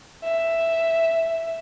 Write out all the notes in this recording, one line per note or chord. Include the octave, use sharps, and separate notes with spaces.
E5